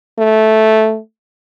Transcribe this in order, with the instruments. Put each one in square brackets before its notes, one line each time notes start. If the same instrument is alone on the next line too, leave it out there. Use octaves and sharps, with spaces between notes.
[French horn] A3